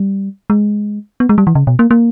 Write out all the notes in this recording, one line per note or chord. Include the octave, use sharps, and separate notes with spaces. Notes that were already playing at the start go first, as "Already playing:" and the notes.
Already playing: G3
G#3
B3
G#3
G3
E3
C#3
B2
A#3
A#3